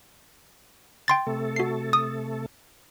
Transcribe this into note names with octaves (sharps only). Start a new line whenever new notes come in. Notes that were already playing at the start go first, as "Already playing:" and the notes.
G5 C6 A6
C3 A3 A4
F#4 C7
D#6